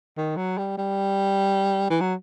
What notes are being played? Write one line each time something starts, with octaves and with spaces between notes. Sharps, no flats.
D#3
F#3
G3
G3
E3
F#3